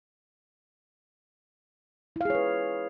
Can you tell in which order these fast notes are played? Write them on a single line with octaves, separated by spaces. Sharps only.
E4 F5 G#4 C#5 B4